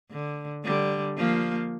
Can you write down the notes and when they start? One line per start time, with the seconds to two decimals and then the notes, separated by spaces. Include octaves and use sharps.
0.11 D3
0.64 D3 G3
1.17 F3 A#3